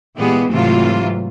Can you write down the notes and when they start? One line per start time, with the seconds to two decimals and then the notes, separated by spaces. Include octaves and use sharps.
0.17 A#2 E3 G#3 B3 G4 G#4
0.49 G#2 C3 E3 F#3 A3 F4